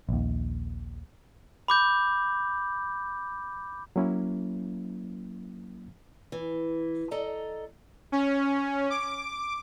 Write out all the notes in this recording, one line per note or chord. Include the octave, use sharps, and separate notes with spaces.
A#1 D#2
B5 D6 G6
F#3 A#3 C#4 E4
E3
A4 D5 D#5 A#5
C#4
D6